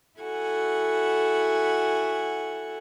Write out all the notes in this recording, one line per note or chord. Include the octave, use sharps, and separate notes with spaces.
E4 F#4 A4 F#5 G#5